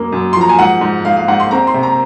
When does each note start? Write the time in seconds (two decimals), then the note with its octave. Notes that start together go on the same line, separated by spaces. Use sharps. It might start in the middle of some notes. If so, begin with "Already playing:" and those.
Already playing: F#2 A#3
0.12 F#2
0.33 F3 C6
0.41 A#5
0.49 G#5
0.59 G#2 F#5
0.81 G#2
1.05 G#2 F5
1.17 F5
1.28 G#2 F#5
1.40 C6
1.51 C4 A#5
1.67 C6
1.74 C3
1.83 A#5